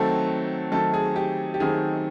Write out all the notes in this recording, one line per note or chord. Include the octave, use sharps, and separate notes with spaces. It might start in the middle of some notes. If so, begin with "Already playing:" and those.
Already playing: D#3 F#3 A3 C4 A4
D#3 F#3 A3 C4 A4
G#4
G4
G4
D#3 F#3 A3 C4 G#4